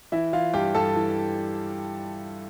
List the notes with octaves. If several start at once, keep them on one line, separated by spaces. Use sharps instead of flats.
E3 E4 E5
E3 F4 F5
G2 G4 G5
G2 A4 A5
E3